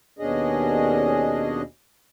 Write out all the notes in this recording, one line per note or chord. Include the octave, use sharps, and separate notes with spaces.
D#2 B2 C#4 D4 G#4 D#5